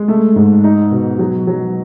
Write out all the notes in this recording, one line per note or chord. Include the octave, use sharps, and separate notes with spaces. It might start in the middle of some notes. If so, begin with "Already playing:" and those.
Already playing: G#3
A3
G#2
D#4
B2
F#3
F#3